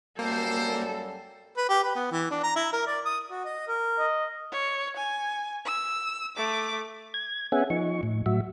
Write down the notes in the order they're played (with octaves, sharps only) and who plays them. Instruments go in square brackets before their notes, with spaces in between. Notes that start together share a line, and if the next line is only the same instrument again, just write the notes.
[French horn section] F#2 F#3 G3 [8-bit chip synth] A#3 [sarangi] A4 [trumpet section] C5
[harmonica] B4
G4
B4
B3
E3
D4
A#5
E4
A#4
D5
D#6
[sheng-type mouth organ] F#4
D#5
A#4
[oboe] D#5
[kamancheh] C#5
G#5
E6
A3 D6
[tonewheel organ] G#6
B3 C#4 G#4 E5 F#5 G#5
F3 D#4 C#6
A2
A2 F#3 F#4 E5